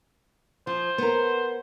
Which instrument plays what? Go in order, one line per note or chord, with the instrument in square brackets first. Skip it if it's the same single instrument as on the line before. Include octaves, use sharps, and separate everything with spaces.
[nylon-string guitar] F3 [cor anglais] C5
[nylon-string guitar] B3 A#4